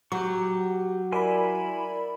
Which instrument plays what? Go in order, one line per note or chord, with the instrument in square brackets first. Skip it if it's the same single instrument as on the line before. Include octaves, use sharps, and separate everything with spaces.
[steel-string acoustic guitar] F#3 [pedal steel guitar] G4 C#6
[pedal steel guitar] E4 G#5 C6 [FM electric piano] A#4 D5 B5